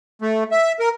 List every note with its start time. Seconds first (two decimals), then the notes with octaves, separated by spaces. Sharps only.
0.22 A3
0.51 E5
0.80 A#4